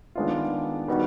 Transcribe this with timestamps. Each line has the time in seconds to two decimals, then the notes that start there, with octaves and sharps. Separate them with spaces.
0.15 D#3 G#3 B3 D4 F4
0.88 D#3 G3 B3 D#4 F#4